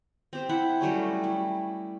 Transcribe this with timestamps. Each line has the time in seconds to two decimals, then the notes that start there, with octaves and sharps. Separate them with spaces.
0.33 C4 G4 C5
0.49 E4 F#5
0.81 F#3 G3 A3 C#4
1.24 E4